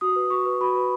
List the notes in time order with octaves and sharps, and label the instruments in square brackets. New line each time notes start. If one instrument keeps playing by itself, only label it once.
[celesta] F#4 D#6
B4
F#4 C#6
B4
F#4 B5
B4